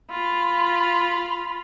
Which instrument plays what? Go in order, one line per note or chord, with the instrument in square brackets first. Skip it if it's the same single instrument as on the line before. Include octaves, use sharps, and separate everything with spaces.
[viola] F4 B5